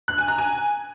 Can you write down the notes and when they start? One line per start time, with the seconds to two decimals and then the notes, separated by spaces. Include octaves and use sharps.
0.08 F#6
0.18 G#5
0.28 A#5
0.38 G#5